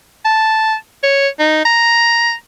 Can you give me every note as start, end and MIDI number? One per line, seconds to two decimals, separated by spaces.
0.25 0.75 81
1.03 1.28 73
1.39 1.63 63
1.65 2.33 82